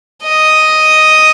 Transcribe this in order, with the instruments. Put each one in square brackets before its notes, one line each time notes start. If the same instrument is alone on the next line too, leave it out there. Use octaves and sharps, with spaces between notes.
[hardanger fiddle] D#5